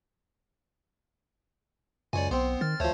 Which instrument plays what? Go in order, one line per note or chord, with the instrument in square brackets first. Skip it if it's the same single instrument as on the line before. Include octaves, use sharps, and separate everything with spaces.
[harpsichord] C#2 C#5 [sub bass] F#2 [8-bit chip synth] D5 G#5
[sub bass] B1 [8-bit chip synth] B3 [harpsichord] C4 C5
[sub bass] D#3 [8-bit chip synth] F6 A6
[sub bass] D2 [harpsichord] F3 A3 [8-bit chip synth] C5 C#5